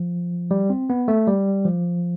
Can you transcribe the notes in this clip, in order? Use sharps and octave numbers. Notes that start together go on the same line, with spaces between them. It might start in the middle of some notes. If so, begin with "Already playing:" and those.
Already playing: F3
G3
C4
B3
A3
G3
F3